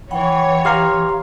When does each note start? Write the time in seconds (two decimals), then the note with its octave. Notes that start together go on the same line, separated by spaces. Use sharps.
0.11 E3 C#5 F#5 G5 B5
0.65 G4 F5 A#5 C6